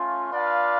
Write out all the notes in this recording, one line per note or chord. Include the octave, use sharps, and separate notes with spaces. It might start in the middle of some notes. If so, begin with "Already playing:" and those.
Already playing: A3 C#4 F4
D4 F4 B4 D5 F5